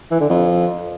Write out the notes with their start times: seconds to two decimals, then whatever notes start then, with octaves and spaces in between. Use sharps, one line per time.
0.11 E3
0.20 D3
0.30 F2